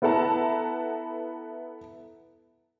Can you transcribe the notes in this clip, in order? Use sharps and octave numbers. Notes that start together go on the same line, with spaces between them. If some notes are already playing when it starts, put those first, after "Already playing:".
B3 E4 A4 F#5 A5 A#5